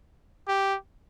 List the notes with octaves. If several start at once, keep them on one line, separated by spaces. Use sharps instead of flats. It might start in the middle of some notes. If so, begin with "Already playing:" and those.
G4